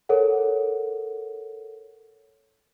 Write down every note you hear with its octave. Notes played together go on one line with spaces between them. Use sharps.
A4 A#4 C#5 F#5